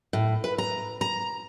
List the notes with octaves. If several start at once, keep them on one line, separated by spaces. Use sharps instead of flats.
A2
B4
A#5
A#5